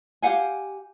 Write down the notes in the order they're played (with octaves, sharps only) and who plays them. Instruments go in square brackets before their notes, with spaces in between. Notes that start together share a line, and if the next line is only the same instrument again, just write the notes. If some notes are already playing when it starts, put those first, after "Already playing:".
[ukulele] G4 F5 F#5 G#5